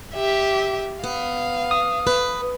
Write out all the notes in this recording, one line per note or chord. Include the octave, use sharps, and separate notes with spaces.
G4 E5
B3 F5
D#6
B4